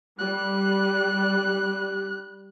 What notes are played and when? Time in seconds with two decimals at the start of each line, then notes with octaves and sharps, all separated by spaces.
0.19 G3 F#6